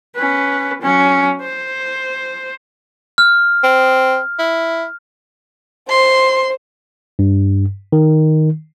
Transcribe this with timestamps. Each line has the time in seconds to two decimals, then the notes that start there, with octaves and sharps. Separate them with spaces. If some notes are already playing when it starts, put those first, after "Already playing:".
0.16 C#4 B4
0.82 F#3 C#4
1.42 C5
3.18 F6
3.64 C4
4.39 E4
5.90 C5 C6
7.19 G2
7.92 D#3